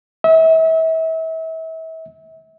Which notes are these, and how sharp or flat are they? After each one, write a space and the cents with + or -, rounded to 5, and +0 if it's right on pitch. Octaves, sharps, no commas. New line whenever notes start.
E5 -35